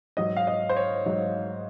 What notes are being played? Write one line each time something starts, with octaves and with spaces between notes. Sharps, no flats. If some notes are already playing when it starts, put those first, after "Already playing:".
G#2 F#3 D#5
F5
D#5
C5
C#5
G#2 F#3